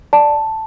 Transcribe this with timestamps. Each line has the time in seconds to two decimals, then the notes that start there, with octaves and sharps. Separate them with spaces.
0.13 D5 A5